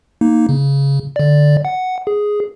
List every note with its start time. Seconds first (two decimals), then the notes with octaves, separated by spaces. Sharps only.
0.21 A#3 D#4
0.49 C#3
1.16 D3 D5
1.65 F#5
2.07 G#4